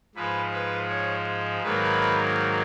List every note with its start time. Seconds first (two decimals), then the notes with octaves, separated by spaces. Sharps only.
0.15 G#2 F3 G#3 B4
0.52 B4
0.89 C#5
1.63 G#2 D#3 F#3 A#3 B4